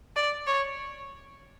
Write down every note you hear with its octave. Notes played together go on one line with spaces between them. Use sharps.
D5
C#5